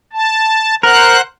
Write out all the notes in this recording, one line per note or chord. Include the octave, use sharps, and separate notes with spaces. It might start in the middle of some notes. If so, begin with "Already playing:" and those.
A5
A#4 C5 F#5 F#6